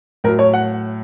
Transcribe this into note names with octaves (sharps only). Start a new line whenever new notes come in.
A2 F#3 A#4
C#5
F#5